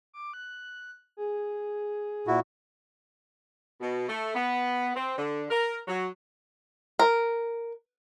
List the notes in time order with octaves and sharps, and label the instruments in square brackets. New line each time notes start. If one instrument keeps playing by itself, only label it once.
[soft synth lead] D6
F#6
G#4
[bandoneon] A#2 E4 F#4
[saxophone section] B2
A3
B3
C4
D3
A#4
F#3
[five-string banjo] A#4